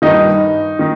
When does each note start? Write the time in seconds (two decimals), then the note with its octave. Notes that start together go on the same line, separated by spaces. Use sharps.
0.02 G2 D#3 D#4
0.79 D#3